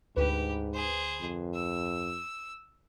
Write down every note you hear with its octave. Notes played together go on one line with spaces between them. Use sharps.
D2 G#2 G4 B4
G#4 C5
F2
E6